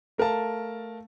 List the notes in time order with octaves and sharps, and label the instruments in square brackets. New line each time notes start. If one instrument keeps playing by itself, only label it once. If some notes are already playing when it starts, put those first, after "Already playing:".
[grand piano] A3 A#4 F5 A5